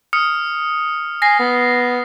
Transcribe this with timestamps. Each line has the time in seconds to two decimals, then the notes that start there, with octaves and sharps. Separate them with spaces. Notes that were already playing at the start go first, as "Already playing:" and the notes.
0.13 D#6 F6 C#7
1.22 G#5 A#6 C7
1.39 B3